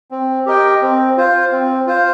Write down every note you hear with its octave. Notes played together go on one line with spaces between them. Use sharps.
C4
G4 A#4 D#5 G5
C4
F4 C5 F5
C4
F4 C5 F5